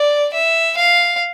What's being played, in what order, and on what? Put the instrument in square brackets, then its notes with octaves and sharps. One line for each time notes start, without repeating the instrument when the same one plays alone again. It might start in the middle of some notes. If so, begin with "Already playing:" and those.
Already playing: [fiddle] D5
E5
F5